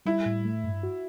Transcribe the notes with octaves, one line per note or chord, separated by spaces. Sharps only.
G3 E4
A2
A3
G2
F#4